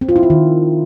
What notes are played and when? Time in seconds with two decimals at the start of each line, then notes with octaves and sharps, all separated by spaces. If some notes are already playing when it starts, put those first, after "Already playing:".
0.01 C4
0.09 F4
0.16 E4
0.23 F4
0.30 D#3